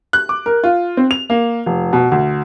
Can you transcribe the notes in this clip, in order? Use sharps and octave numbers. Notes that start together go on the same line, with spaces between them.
F#6
D6
A#4
F4
C4
F7
A#3
F1
B2
D2